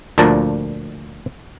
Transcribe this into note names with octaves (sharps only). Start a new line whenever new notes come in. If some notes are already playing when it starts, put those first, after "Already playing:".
D2 A#2 F3 D4 A5 A#5